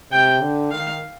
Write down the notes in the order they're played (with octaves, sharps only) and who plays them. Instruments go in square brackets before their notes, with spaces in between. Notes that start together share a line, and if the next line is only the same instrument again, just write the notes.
[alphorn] C3 [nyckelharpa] G5
[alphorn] D3
[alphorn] D#3 [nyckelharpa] F5